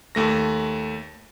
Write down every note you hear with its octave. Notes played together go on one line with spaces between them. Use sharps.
D#2 A3 A#6